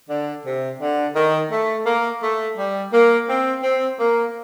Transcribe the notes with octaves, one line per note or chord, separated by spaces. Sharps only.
D3
C3
D3
D#3
A3
A#3
A3
G3
A#3
C4
C4
A#3